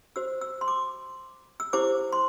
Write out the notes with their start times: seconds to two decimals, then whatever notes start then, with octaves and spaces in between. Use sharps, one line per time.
0.16 F#4 C5 E6
0.41 E6
0.61 C6
0.68 D6
1.60 E6
1.73 E4 G4 C5 D6
2.13 C6